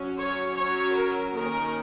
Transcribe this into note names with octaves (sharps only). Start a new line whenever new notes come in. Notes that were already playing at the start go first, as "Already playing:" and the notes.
Already playing: F#3 C#4
C#5
F#3 C#4 C#5
A#4
D#3 A#3 C#4 A#4